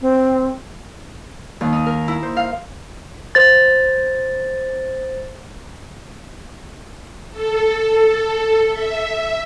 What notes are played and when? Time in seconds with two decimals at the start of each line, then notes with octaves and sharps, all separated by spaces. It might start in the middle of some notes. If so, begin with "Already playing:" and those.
0.01 C4
1.61 D#2
1.73 D#4
1.86 A#4
2.08 E4
2.23 C5
2.37 F5
3.35 C5 A6
7.31 A4
8.67 E5